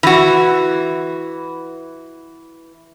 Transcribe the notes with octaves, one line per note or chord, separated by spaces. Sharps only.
E3 F#4